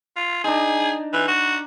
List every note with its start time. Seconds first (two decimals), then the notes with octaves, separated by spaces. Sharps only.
0.16 F4
0.44 D4 D#4 G#4
1.13 E3
1.27 F#4